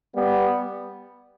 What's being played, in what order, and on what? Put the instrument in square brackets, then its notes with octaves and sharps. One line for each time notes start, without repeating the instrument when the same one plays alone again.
[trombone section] G3 B3